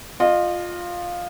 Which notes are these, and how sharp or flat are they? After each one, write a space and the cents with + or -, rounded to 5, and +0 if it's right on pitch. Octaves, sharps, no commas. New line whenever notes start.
F4 +10 D#5 -30